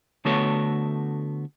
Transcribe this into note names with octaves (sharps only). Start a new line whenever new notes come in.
D3 A3 B3 F#4 A4 C#5